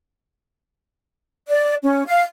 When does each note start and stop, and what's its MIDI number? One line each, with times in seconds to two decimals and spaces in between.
1.48 1.74 74
1.83 2.04 61
2.07 2.23 77